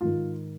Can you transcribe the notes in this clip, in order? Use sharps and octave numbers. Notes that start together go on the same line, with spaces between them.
G#2 D#3 F4